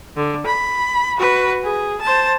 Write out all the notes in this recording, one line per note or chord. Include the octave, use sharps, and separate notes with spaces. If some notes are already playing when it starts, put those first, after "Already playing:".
D3
B5
F#4 B4
G#4
C5 A5